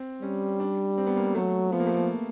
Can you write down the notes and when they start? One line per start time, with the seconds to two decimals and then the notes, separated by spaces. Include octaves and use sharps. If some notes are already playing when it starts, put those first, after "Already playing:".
Already playing: C4
0.22 G3 C#4
0.60 D4
0.98 C4
1.07 B3
1.16 A#3
1.35 F#3 A3
1.72 F3 B3
1.80 A#3
1.87 A3
1.94 A#3